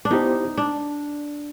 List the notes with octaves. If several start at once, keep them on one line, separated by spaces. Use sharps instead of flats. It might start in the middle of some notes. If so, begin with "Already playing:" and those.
D4
B3 D#4 E4 G4 C5
D4